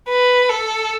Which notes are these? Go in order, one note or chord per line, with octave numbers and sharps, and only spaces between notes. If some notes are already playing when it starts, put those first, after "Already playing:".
B4
A4